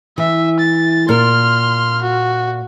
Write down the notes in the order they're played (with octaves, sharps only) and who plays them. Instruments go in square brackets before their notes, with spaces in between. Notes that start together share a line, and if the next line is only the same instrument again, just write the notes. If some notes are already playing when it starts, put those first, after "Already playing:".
[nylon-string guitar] E3 [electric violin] E5
[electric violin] A6
[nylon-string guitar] A#2 A#4 [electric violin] C6 F6
[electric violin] F#4